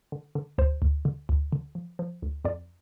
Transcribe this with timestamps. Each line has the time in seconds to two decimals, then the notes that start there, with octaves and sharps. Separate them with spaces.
0.12 D3
0.35 D3
0.58 D2 C5
0.82 D2
1.05 D3
1.29 D2
1.53 D3
1.75 F3
1.99 F3
2.22 D2
2.45 F2 D5